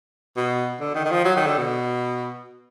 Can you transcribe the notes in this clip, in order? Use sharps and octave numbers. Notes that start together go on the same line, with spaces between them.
B2
D3
D#3
D#3
F3
F#3
D#3
D3
B2